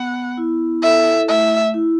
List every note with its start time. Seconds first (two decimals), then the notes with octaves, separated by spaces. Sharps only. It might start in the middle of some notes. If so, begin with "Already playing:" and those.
Already playing: B3 F#5
0.37 E4
0.83 A4 E5
1.29 A3 E5
1.74 E4